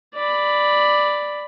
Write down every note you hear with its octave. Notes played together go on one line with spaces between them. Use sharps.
D5 B5